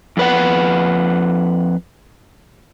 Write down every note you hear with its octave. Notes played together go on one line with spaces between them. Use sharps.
F2 B4 F#5